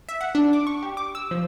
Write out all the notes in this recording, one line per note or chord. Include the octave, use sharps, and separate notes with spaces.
E5
F#5
D4
D6
C#6
G4
D6
E6
F3